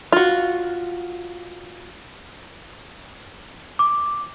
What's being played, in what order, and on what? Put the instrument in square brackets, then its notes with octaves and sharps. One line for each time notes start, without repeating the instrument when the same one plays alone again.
[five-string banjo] F4 F#4
[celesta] D6